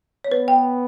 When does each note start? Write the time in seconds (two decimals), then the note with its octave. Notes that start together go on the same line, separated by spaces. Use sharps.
0.24 C#5
0.31 B3 B4
0.48 G5